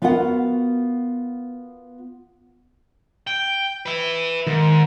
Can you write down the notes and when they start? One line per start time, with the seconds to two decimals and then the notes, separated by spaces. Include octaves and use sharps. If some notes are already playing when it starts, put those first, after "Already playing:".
0.02 B3 F4 F#4 A#4 F#5
3.27 G5
3.86 B4 E5
4.47 G#2 D#3